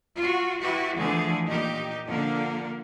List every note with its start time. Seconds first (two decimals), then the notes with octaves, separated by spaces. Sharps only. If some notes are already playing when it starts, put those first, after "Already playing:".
0.15 F4 F#4
0.60 E4 F#4 G4 B4
0.97 D3 E3 F3 A3 G#4
1.47 A#2 D#4 G4
2.07 D3 F3 A#3